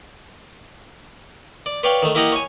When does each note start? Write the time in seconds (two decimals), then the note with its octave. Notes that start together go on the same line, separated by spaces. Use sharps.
1.66 D5
1.83 B4 C#5 D5 F5 G5
2.02 D#3 A3
2.15 A#3 E4 G4 D#5 F#5 A#5
2.32 C#5 G#5